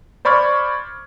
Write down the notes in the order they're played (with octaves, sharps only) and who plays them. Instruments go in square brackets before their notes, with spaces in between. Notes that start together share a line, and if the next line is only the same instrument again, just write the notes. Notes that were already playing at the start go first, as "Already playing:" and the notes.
[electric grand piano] C5 D5 B5 C#6 F6 G#6